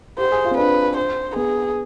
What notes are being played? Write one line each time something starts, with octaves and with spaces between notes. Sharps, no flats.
G4 C5
G#4
F4
C4
D4 B4
C5
B3 G#4